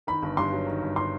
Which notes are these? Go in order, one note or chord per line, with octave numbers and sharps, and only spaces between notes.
D#3 B5
G1
G2 C6
F#3
D#3
G1
C6